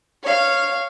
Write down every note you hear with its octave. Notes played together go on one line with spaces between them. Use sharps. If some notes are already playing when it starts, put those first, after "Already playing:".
C#5 F5